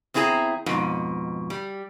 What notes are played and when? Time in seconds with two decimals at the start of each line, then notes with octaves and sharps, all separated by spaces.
0.14 E2 C4 E4 G#4 A#5
0.66 F2 G#2 B2
1.50 G3